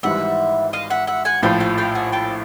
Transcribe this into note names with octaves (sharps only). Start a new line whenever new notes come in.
G#1 G#2 E3 G3 E5 F#5
D#5 F5
E5 F#5
E5 F#5
F#5 G#5
A#1 A2 F3 F5 G5
F5 G5
F5 G5
F#5 G#5
G5 A5